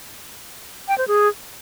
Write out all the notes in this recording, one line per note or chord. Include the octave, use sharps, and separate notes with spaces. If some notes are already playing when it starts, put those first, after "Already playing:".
G5
C5
G#4